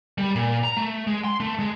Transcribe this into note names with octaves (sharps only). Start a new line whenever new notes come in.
G3
A#2
A#5
A3
G#3
C6
A3
G#3